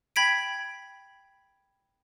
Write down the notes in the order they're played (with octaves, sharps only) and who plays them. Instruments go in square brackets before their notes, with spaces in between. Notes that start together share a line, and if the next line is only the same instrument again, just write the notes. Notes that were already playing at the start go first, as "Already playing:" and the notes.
[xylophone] G5 B5 G#6 B6 D7